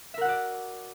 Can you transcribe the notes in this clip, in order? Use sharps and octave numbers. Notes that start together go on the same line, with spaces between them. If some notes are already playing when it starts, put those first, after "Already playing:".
F#4 A#4 D5 E5 F#5